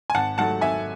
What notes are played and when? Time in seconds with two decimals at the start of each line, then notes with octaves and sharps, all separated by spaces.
0.10 G#5
0.15 G#1 F#5 A5
0.38 G#2 F#3 A3 F#5 A5
0.61 G#1 E5 G#5